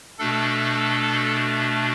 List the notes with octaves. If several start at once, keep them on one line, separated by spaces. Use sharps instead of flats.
B2 A3 D4 A4